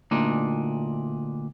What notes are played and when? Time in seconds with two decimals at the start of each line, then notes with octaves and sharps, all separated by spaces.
0.11 D2 A#2 D4 D#4